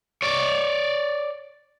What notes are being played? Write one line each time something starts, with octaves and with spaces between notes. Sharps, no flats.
C#5 D5